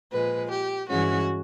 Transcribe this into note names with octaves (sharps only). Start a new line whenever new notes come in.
A#2 F3 G#3 B4
G4
G2 E3 G#3 C#4 F#4